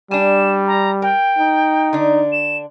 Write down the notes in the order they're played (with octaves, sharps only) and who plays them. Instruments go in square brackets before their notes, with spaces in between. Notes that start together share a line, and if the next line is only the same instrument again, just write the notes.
[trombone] G3 [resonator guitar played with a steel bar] D4 G#5 [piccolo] E7
[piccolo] A#5
[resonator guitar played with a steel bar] A#4 [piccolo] G5
[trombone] D#4
[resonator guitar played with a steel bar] D3 D4
[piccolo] E7